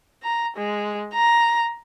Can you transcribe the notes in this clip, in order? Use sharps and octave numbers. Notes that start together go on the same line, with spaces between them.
A#5
G#3
A#5